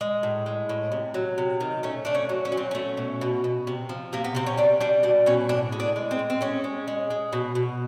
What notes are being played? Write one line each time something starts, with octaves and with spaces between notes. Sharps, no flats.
G#3
A2
G#3
A2
C3
F#3
C3
D#3
A3 C#4
A3 D4
C#4
F#3
C#4
F#3
C4
A3 C#4
B2
B2
B2
C3
F3
C3 A#3
B3
C3 C4
C#4
G3 D4
G3 D4
B2 D4
B2 C#4
A2 D4
G#3
D4
G#3
C4
A2
C4
G#3 C#4
G#3
G#3
G#3
B2
B2